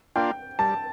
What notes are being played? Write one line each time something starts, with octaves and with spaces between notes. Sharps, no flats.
A#3 D4 F4 G5
G3 A5